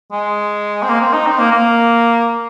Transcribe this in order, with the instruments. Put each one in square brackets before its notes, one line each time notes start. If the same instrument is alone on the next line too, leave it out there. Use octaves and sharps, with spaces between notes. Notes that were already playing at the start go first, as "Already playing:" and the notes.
[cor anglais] G#3
C4
A#3
C4
D#4
C4
A#3
A#3